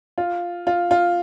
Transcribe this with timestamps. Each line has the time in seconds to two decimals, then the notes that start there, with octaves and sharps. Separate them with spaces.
0.18 F4
0.67 F4
0.91 F4